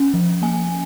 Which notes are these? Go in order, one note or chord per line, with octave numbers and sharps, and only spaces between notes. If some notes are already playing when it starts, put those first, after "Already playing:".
Already playing: C#4
F3
A#3 G#5